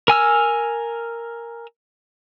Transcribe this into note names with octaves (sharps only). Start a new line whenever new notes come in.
A#4 G#5 E6 F6